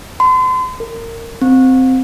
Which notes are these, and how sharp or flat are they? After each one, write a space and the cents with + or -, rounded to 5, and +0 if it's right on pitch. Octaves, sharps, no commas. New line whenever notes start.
C6 -40
A#4 -20
C4 -10